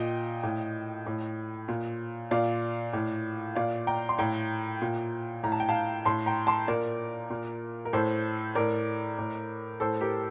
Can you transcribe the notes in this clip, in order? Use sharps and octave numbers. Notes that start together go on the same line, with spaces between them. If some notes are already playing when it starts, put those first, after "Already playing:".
Already playing: A#2 D#5 G5
A2
A2
A#2
A#2 D5 F5
A2
A#2 D5 F5
G5 A#5
C6
A2 G5 A#5
A#2
A2 A#5
A5
G5
F5 A5
A2 A5 C6
G5 A#5
A5 C6
A#2 A#4 D5
A#2
A#4
A2 A4 C5
A2 A#4 D5
A2
A2 A4 C5
G4 A#4